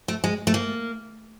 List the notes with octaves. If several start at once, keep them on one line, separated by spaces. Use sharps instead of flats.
A3
G#3
A3
A#3